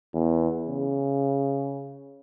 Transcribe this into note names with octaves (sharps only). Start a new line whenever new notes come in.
E2
C#3